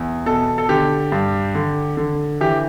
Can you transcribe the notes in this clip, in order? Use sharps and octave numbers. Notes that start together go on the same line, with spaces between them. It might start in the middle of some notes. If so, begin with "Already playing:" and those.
Already playing: E2
B2 A4
A4
D3 G4
G2
D3
D3
E3 G4